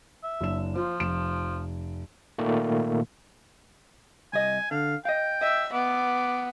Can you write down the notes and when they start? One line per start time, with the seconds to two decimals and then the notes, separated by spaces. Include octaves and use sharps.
0.23 E5
0.41 F#1 D4 E7
0.75 F3 F4 C5
1.00 F1 D7 E7
2.38 A#2 D#3 A3 A#3
4.33 C2 D#5 G#5
4.71 D3 F5
5.05 D#5 F5 G5
5.42 D#5 E5
5.73 B3 D6